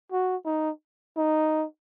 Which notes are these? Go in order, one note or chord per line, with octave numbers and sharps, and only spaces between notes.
F#4
D#4
D#4